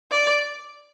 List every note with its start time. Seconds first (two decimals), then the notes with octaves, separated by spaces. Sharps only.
0.11 D5